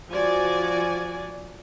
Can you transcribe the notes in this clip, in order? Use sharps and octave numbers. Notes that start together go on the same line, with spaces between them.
F3 F#4 D5 G#5